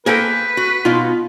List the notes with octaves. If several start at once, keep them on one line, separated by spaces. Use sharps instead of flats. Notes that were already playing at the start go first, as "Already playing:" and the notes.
A#3 G#4 A4 B4 C5 G5
F#4
B2 B3 D#4 F4